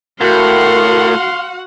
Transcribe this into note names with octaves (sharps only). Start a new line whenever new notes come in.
A2 F#4 A#4 F5 F#5 C6